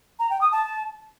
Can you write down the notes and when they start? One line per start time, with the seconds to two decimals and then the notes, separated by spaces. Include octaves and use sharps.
0.19 A#5
0.30 G5
0.41 D#6
0.52 A5